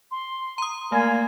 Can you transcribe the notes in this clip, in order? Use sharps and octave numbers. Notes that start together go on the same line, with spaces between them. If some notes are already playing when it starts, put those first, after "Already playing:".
C6
A#5 D#6
A3 A#3 G#5